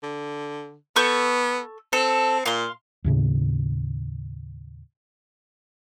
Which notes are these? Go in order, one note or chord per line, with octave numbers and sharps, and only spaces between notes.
D3
B3 A4 C#6 G6
C4 A4
A#2 F5 C6
D#2 A2 C#3